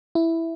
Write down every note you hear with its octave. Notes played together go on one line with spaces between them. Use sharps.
E4